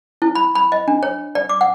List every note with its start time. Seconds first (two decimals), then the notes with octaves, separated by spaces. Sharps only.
0.22 E4
0.35 B5
0.55 B5
0.72 D#5
0.88 D4
1.03 C#5
1.35 D5
1.49 D6
1.61 F#5